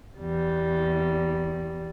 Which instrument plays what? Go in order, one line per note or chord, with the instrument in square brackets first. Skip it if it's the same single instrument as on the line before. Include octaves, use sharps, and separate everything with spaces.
[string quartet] E2 G3